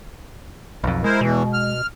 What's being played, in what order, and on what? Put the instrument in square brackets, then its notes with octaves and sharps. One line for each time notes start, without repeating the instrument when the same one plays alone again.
[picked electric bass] B1 F2
[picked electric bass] G#3 [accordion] E4 A#4 C5
[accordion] E2 E3 [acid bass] B2
[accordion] F6